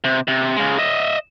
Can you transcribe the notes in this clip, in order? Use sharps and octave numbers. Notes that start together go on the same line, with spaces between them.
C3
C3
C#3 G#3
D#5 E5